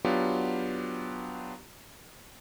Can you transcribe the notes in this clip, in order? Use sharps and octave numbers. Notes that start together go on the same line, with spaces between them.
F#3 B3 D4 F4 G4